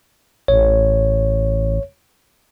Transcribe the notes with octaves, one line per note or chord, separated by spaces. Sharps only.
A1 C#5